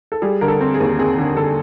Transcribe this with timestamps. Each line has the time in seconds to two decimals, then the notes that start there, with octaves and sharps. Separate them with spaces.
0.12 A4
0.22 G3 G#4
0.41 D3 A#4
0.48 A4
0.61 C4
0.74 G#4
0.80 D#2
0.99 C4 G#4
1.18 D3
1.37 D3 A4